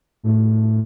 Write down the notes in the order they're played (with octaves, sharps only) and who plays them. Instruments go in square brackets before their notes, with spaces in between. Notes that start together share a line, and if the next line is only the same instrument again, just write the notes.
[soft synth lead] A2